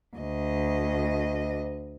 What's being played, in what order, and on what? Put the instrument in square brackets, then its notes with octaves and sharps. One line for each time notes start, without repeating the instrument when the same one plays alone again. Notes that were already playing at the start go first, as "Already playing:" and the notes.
[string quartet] D2 D#5